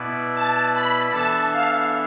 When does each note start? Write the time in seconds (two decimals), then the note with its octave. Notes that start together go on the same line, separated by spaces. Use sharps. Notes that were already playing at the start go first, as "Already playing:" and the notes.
Already playing: B2 B3 E4 B4 D5
0.33 A5
0.73 B5
1.11 E3 B3 D4 A4 E5 A5
1.51 F5